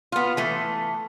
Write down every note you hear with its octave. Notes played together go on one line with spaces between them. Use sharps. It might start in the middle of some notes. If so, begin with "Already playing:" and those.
B3 F4
E3 A3